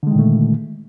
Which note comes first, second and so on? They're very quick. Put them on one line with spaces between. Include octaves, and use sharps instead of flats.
D3 G#3 D#3 A#2 A3